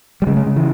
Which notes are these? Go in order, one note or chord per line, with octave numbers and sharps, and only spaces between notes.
G3
C#3 G#3
G#3
C#3
E3